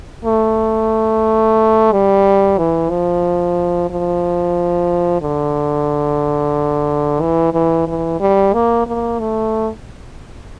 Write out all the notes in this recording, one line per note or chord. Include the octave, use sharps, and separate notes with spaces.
A3
G3
E3
F3
F3
D3
E3
E3
E3
G3
A#3
A#3
A3